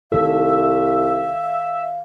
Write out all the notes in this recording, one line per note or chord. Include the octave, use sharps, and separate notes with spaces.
C2 D#3 A4 E5 F5